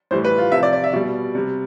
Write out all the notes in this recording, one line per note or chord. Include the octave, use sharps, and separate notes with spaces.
A2 E3 G3 C5
B4
F4
C3 F3 E5
D5
D5
E5
B2 G3 D5
C3 G3